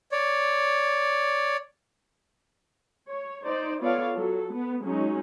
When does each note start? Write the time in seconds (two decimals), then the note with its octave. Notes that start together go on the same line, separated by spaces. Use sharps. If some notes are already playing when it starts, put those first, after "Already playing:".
0.12 C#5 D5
3.09 C#5
3.43 D#4 C5 D5
3.80 B3 F4 A4 C#5 D5 F5
4.14 F#3 A4
4.53 B3
4.84 F#3 G#3 C#4 D#4